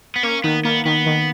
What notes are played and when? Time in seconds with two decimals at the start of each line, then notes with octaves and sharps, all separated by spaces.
0.16 B3
0.23 A#3 C#4
0.44 D#3 B3
0.65 A#3 B3
0.85 D#3 B3
1.06 D#3